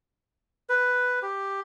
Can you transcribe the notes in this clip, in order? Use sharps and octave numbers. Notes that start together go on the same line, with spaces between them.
B4
G4